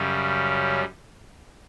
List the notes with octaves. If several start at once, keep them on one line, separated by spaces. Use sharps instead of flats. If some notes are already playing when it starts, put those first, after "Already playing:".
Already playing: F#2 C#3 G3 C#4